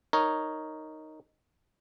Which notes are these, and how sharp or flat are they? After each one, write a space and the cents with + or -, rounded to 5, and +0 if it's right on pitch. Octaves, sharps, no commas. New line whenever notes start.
D#4 +0 A#4 +0 C#5 +0